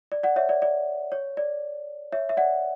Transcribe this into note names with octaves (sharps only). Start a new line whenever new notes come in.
D5
D5 F#5
C#5 E5
D5
D5
C#5
D5
C#5 E5
E5
D5 F#5